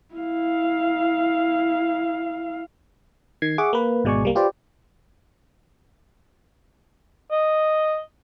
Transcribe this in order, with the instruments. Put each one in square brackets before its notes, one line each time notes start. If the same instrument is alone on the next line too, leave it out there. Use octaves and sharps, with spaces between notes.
[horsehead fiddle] E4 F5
[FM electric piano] D#3 G#6 C7
G#4 E5 F#5 C#6 D6
A#3 B4
G#1 B2 G#3 D5 G#5 C#6
C2 G3 A#3
F4 G4 B4 C5 D5
[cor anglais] D#5